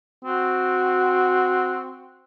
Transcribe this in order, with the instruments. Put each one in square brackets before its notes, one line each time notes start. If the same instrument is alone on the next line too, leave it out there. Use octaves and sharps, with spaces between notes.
[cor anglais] C4 [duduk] F#4